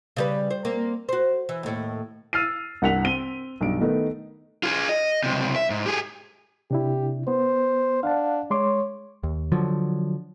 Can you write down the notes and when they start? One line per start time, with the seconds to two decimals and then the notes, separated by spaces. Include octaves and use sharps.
0.16 C#3 G3 B4
0.51 C5
0.65 A#3 C4
1.09 F#4 C5
1.49 E3
1.63 D#2 A2
2.33 E6 F6 A6 C7 D#7
2.82 C2 G2 F#5 B6 F7
3.05 C4 D#7 G7
3.61 B1 G2 D7
3.81 D#3 A3 B3 D#4
4.63 F4 G#4
4.89 D#5
5.24 C#2 C3
5.56 E5
5.70 G#2
5.86 G4 G#4
6.71 C3 D4 E4 G4
7.28 B3 C5
8.03 D4 F5 F#5 A5
8.51 G#3 C#5 C6 D6
9.23 D#2
9.52 D3 F3 F#3